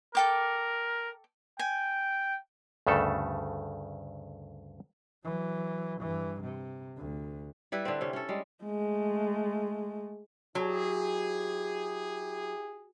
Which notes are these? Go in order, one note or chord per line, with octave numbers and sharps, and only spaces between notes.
A4 A#4 G5 D6
G5 G#5
D2 G2 C#3 A3 A4
E3 F#3
G2 E3
C3
D2
G3 E4 B4
D3 C4
C3 C#4
C#4 A4
G3 G#3
G#3 A3
F#3 E4 G4 G#4